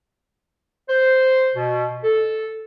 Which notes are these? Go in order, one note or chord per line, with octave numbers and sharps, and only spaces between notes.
C5
B2
A4